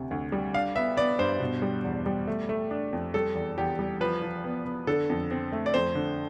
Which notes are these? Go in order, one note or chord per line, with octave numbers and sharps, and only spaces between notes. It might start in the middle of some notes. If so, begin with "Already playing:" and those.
Already playing: D2 C3
D2
G3
D4 F5
B3 E5
B3 D5
G2 C5
B2
G3
E2
G3
A3
A3
D4
F2
G3 A4
E2
E2 G4
G3
F3 B4
F3
B3
B3
D3 A4
F2
C4
A3
D5
F2 C5
D3